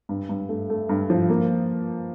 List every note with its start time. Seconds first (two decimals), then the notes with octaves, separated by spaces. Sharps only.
0.09 G2
0.29 G2
0.49 A3
0.70 A3
0.89 G2
1.10 F3
1.29 A#3